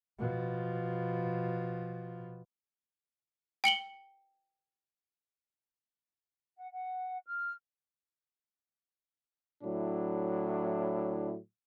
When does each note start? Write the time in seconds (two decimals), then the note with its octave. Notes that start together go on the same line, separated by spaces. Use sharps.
0.19 B2 F3
3.64 G5 C#7 F#7 G7
6.57 F#5
6.73 F#5
7.26 F6
9.63 A2 F#3 D4 E4